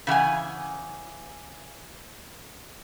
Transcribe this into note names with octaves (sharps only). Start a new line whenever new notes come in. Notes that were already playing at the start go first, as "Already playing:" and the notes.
C#3 E3 F#5 G#5